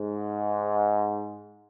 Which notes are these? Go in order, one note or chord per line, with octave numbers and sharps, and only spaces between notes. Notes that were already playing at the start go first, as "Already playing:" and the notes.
Already playing: G#2